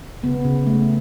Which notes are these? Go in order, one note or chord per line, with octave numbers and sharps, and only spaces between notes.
C#3 B3
C#3
A3